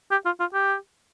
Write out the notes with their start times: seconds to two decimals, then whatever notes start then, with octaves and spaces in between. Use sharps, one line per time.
0.11 G4
0.25 F4
0.40 F4
0.53 G4